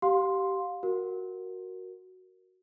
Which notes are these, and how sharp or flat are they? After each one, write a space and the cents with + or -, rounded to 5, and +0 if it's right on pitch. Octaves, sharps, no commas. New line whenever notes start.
G4 -20 F5 +25 C6 +0
F#4 +0 A#4 +0